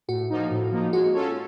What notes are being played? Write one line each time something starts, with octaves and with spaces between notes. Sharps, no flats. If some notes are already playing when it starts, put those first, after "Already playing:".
A2 F#4
F3 A#3 D#4
A2
F3 A#3 D#4
G#3 F#4
C#4 F4 A4 C#5